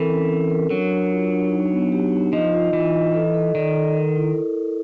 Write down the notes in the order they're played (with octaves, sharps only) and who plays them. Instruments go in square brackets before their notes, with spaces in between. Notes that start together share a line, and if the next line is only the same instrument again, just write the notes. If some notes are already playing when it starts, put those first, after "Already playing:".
Already playing: [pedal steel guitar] E3 [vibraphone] C4 A4 A#4
[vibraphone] C#4
C#4
A#4
[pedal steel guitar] F#3 [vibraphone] D4
[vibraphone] D4
F4
D4
D#4
B3
G4
D#4
[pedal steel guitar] F3 [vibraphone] D#5
[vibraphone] F4
[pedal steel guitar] E3 [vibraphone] F4
[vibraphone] D#5
A4
A4
[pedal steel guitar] D#3 [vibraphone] D5
[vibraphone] A4
A#4
E4